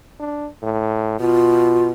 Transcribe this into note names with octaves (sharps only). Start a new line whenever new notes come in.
D4
A2
B2 F4